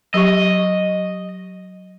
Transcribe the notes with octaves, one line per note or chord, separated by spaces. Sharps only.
F#3 G4 D#5 C#6